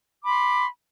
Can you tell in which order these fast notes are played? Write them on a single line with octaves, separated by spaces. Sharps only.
D6 B5 C6